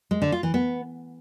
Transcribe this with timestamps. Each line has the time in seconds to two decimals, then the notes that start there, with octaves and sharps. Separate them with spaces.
0.11 G#3
0.22 D3
0.32 F4
0.43 E3
0.54 B3